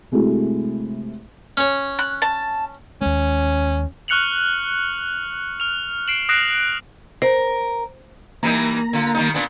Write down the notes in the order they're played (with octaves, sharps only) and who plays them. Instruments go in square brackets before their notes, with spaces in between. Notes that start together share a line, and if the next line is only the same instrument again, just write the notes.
[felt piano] C3 G#3 A3 E4 F#4
[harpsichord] C#4 C#5
[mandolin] F#6
A5
[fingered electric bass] D#2 G#3 [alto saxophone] C#4
[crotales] C#6 F6 F#6 C#7 F7 F#7
F6 F7
C7 D7 E7 F#7
D#6 F#6 A#6 C7 D7 E7
[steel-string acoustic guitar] A#4 [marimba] C5
[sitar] E3 G3 D#4 [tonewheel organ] A#3 A#5
[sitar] D3 F4
D#3 G3 D#4
A#2 B3 D4